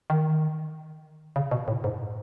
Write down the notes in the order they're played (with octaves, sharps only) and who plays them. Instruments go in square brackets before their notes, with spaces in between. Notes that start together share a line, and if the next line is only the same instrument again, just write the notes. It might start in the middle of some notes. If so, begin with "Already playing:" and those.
[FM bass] D#3
C#3
B2
A2
G#2